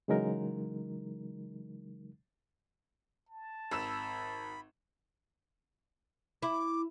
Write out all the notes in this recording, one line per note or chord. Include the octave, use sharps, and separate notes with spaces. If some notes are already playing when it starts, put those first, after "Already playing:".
C#3 E3 F#3 G#3 D#4 A#4
A5
G#1 B5 E6 E7
E4 D6